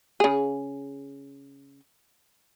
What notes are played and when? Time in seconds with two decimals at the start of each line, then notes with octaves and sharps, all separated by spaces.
0.20 C#3 G#4